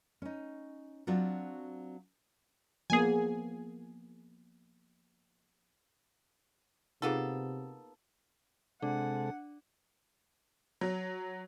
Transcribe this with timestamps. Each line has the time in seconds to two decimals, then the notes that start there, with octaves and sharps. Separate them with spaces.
0.22 C#4 D#4
1.07 F#3 C4 D4 F4 F#4
2.90 F3 A#3 B3 G#4 G#5
7.02 C3 A#3 B3 D#4 F4 G#4 A4
8.82 C3 G#3 D4 A4 F#5
10.81 F#3